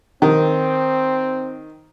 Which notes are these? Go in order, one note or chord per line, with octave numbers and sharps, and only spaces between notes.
D#3 C4